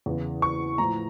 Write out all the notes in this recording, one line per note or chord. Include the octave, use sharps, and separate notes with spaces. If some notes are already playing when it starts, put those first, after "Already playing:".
E2 C#3 E3
C#6
A2 F3 A#5